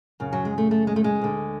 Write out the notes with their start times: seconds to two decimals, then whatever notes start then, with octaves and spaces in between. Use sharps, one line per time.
0.20 F#2 C#3
0.33 F#3
0.45 G#3
0.58 A3
0.71 A3
0.87 G#3
0.96 A3
1.04 G#3
1.21 D2 D3